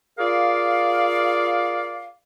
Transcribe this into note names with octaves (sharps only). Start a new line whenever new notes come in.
F4 G#4 A#4 D5 F5